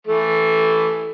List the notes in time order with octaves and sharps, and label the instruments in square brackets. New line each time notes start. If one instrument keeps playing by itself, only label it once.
[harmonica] E3 A3